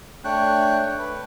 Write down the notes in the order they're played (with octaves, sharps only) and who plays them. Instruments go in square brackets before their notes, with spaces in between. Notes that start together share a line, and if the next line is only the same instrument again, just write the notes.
[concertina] A3 D4 C#5 G5 F#6
B4